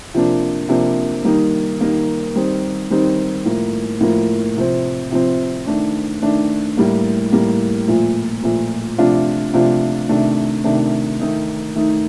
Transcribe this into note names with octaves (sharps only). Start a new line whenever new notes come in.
C3 F3 A#3 D4
C3 F3 A#3 D4
D#3 G3 A#3 D#4
D#3 G3 A#3 D#4
D#3 G3 C4 D#4
D#3 G3 C4 D#4
A2 F3 A#3
A2 F3 A#3
C3 F3 C4
C3 F3 C4
D#3 A3 D4
D#3 A3 D4
A2 G3 A#3
A2 G3 A#3
A#2 F3 A3
A#2 F3 A3
C3 F3 A3 D4 F4
C3 F3 A3 D4 F4
C3 D#3 A3 D4
C3 D#3 A3 D4
D#3 A3 D#4
D#3 A3 D#4